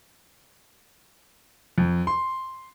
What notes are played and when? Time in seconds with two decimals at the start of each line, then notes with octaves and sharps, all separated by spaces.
1.78 F2
2.07 C6